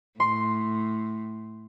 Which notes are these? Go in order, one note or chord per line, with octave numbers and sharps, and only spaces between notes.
A2 C6